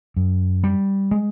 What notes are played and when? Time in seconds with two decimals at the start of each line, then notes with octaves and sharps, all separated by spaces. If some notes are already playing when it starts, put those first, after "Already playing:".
0.16 F#2
0.64 G3
1.11 G#3